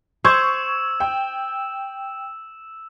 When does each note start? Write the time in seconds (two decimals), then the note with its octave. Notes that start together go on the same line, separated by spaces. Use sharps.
0.25 C5 C#6 E6 G#6 E7
1.00 G5